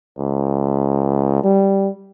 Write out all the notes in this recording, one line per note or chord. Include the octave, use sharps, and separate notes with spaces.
C#2
G3